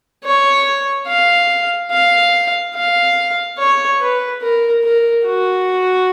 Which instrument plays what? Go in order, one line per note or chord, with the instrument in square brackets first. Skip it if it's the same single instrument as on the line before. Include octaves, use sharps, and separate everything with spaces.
[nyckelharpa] C#5
F5
F5
F5
C#5
B4
A#4
A#4
F#4